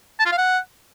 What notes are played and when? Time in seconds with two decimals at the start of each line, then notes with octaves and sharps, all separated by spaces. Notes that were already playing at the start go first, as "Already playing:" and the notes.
0.20 A5
0.26 F4
0.32 F5
0.38 F#5